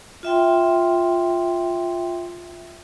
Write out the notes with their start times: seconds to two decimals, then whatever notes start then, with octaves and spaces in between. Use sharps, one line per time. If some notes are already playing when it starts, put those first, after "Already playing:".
0.23 F4 E5 G5 C6